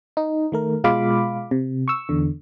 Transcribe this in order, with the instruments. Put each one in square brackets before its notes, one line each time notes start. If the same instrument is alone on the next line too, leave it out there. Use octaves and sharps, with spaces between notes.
[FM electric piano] D#4
D#3 A3 A#4
B2 G#3 F4 F5 B5 D6
C3
C#6 E6
E2 D3